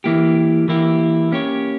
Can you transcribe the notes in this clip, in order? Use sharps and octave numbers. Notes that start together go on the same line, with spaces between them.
E3 A#3 E4 G4
E3 A#3 E4 G4
A#3 C#4 G4 C#5